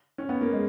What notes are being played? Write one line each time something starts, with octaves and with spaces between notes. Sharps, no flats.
C#4
B3
A#3
G#3